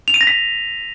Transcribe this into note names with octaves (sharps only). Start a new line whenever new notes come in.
F7
D#7
A#6
B6